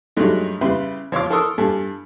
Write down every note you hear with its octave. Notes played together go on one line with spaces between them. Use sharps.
G2 F#3 G#3 A3 D#4
C#3 G3 E4 B4 B5 C6
F3 C#5 F5 D6
A4 A#4 C6 C#6 D#6 E6
G2 A4 G#5